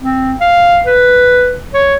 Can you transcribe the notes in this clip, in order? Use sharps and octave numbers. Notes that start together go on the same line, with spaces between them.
C4
F5
B4
C#5